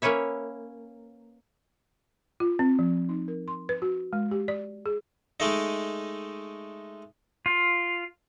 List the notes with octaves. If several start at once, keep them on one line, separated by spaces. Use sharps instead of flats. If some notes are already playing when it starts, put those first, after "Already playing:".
A#3 C#4 B4 C#5 E5
F4
C4
F3
D#4
A#4
C6
B4
F#4
G#3
G4
D5
G#4
G#3 A3 D#4
F4